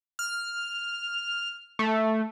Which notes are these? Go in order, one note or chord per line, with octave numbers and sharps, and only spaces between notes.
F6
A3